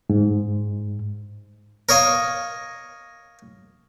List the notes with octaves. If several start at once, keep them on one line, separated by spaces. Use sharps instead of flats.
G#2
A#4 C#5 D#5 F5